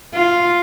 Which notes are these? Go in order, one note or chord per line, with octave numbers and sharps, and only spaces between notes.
F4